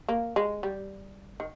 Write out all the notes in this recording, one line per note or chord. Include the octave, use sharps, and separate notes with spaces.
A#3
G#3
G3
D#3